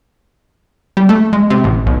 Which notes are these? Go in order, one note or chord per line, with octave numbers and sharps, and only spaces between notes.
G3
A3
G#3
C3
A1
B1